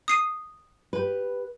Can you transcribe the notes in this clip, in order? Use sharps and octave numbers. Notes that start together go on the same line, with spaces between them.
D#6 C7 D#7
G4 B4